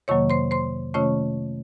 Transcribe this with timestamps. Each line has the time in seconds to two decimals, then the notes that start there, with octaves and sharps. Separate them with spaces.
0.08 F2 C3 D#3 F#3 A#3 C#5 C#6
0.30 C5 C6
0.51 C5 C6
0.94 C3 D#3 A3 C#4 F4 C#5 C#6